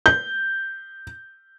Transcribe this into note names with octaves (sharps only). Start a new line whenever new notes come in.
G6